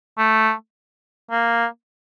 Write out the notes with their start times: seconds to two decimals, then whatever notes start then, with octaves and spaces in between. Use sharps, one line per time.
0.18 A3
1.32 A#3